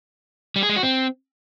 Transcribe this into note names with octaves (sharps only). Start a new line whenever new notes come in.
G3
G#4
G#3
F#4
C4